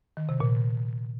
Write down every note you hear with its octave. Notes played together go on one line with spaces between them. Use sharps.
D#3
C3
A#2